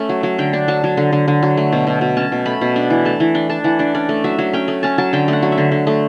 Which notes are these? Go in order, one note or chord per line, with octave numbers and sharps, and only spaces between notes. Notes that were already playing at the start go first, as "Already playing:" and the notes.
Already playing: A3 C#4
F#3
F#3
D3 G5
D4
F#3 A5
F#3
D3
D3
D3
F#3
A3
B2
B2
B2
C#4 A5
B2
A3 B5
B2
D4 B5
E3
A3 A5
E3
D4 G5
D4 A5
E3 F#5
D4 D5
C#4 D5
A3
F#3 E5
F#3
C#4 G5
A3
C#4 A5
F#3 A5
D3 G5
A3 F#5
F#3
E5
D3
D3
A3